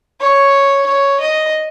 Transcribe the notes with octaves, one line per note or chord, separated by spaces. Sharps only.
C#5
C#5
D#5